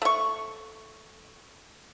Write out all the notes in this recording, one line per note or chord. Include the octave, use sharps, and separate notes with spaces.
A3 C#6